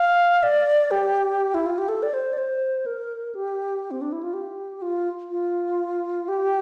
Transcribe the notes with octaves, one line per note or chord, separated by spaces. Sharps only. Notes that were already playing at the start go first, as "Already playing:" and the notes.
Already playing: F5
D5
G4
E4
F4
G4
A4
D5
C5
D5
C5
A#4
G4
C4
D4
E4
F4
G4
F4
F4
G4